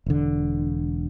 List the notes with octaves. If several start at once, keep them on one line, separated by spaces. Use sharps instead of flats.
E1 D3